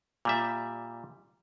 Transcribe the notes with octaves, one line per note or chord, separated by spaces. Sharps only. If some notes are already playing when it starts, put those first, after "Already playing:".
A#2 G3 E5